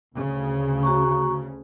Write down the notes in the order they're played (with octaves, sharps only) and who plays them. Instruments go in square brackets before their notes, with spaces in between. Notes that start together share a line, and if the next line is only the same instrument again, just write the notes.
[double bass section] D2 C#3
[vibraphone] F#4 A#5 C#6